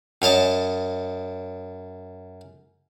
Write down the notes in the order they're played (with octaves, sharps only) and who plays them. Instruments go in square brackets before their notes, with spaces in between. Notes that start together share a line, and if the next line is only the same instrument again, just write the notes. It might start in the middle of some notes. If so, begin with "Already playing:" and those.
[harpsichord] F#2 C#5 D#5 A5